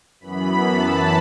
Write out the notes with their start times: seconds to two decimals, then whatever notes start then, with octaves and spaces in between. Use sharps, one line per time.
0.20 F#2 E3 B3 B5
0.67 A5